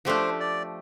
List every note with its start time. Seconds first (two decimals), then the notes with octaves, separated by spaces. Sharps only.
0.05 F3 A3 D4 G4 C5
0.40 D5